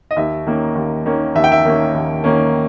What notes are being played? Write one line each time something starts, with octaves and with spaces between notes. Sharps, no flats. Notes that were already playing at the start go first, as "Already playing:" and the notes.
D#5
D#2 E5
D#3 A#3 C#4
D#2
D#3 A#3 C#4
D#2 E5
G5
E5
D#3 A#3 C#4
D#2
D#3 A#3 C#4